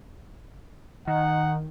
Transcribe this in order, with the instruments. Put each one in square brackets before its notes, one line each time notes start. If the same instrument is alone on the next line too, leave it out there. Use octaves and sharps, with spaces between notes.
[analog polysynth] D#3 [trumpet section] D#4 F#5